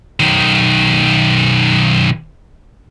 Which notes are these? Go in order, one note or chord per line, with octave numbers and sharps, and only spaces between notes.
B1 D#3